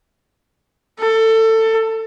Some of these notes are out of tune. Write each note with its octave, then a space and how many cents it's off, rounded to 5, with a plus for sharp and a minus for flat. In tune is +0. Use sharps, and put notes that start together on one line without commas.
A4 +20